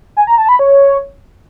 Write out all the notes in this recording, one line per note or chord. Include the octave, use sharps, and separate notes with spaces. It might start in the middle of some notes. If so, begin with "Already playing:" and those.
G#5
A#5
A5
B5
C#5